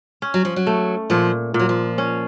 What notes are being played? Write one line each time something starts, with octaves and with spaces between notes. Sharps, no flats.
C#4
F#3
F3
F#3
A3
A#2 F3
A#2
F#3
F3
C#4